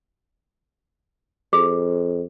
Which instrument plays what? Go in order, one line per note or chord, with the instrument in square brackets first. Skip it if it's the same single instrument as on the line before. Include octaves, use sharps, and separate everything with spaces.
[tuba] F2 [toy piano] G#4